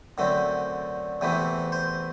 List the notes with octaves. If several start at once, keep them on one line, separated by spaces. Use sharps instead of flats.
F#2 D3 A3 C4
E2 C3 E3 A3 C4
C5